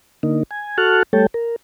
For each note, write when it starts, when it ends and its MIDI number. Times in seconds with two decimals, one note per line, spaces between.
0.23 0.43 50
0.23 0.43 58
0.23 0.43 63
0.51 0.77 80
0.78 1.03 66
0.78 1.03 69
0.78 1.03 81
0.78 1.03 85
0.78 1.03 89
0.78 1.03 90
1.13 1.26 55
1.13 1.26 57
1.13 1.26 69
1.13 1.26 73
1.13 1.26 79
1.13 1.26 81
1.34 1.56 70